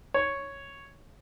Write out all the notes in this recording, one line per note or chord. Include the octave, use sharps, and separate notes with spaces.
C#5